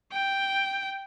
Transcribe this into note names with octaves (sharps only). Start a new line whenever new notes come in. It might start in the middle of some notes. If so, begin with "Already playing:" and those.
G5